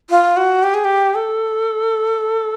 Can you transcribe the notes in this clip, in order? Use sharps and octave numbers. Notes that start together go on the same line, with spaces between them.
F4
F#4
G4
G#4
G4
A4